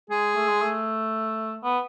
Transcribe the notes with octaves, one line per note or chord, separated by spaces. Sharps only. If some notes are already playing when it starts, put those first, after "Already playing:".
G#3 G#4
A3
G#3
A3
B3